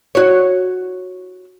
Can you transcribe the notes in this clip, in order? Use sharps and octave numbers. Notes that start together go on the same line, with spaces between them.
F#4 C#5